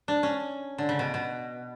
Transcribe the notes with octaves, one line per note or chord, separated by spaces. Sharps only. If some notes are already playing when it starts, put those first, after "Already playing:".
D4
C#4
D3
C#3
B2
B2